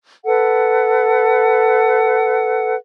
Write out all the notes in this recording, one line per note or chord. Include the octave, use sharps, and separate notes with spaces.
A4 B4 F#5